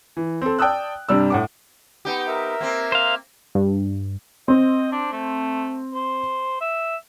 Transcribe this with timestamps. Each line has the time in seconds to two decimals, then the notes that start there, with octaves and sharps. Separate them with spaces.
0.17 E3
0.41 C4 A4
0.59 D5 G5 A5 D#6 E6 F#6
1.09 G2 C3 G3 D5 E6
1.30 A2 F#5 D6
2.05 B3 D#4 G4
2.28 A#4 E5
2.61 A#3 C4
2.92 C5 F5
3.55 G2
4.48 C4 D#5
4.92 D4
5.12 A3
5.94 C5
6.61 E5